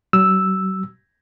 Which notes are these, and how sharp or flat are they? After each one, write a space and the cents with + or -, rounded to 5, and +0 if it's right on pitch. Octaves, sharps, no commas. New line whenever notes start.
F#3 +40 E6 +0